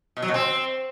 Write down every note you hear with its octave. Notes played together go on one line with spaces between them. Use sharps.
B2
F#3
B2
C4